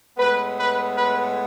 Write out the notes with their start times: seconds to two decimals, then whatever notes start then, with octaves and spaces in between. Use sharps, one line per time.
0.18 A2 G#3 B3 B4
0.57 B4
0.96 B4